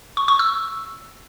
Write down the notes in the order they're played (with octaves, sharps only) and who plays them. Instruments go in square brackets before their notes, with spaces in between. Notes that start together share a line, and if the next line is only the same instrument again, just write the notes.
[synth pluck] C#6
C#6
E6